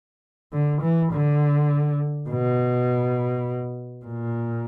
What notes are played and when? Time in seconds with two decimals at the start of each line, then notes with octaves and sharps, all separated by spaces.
0.53 D3
0.82 E3
1.12 D3
2.29 B2
4.06 A#2